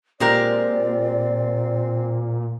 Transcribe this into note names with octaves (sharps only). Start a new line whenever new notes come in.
A#2 G#3 C4 G4 A#4 D5